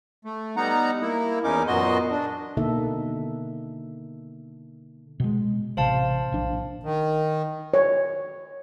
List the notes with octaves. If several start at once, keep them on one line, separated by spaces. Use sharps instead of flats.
A3
G3 B3 D#4 F#5 A#5
A#3 E4
E2 C#4 D#4 A#4 D6
F#2 A#2 B3 F#4 D#5 C6
D4
B2 D3 A#3 D#4 A4 E5
B2 G#3
A1 C3 C5 F5 A5
A#1 D4
D#3
C#5